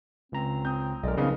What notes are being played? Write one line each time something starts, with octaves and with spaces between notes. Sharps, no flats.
C#2 C4 A#5
C4 D#6 G6
B1 G#3 A#4 D5 D#5
C#3 F3 B3 D#4 F5